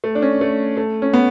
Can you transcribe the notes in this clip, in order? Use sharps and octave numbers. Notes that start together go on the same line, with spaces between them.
A3
D4
C#4
A3
A3
C#4
B3